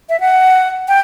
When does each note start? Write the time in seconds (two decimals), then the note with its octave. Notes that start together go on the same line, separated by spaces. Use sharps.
0.09 E5
0.20 F#5
0.88 G5